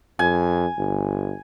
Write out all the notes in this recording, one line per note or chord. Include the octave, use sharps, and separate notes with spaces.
F2 G#5
G1